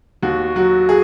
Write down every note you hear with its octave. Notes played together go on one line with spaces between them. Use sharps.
D#2 F#4
F#3 F#4
G#4